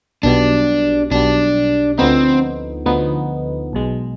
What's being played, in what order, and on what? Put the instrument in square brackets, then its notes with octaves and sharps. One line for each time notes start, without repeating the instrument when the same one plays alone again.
[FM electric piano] B1 B2 G3 [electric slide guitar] D4
[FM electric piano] B1 B2 G3 [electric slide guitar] D4
[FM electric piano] D2 D3 F3 B3 D#4 [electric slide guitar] C4
[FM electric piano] D2 D3 F3 B3 D#4
B1 B2 G#3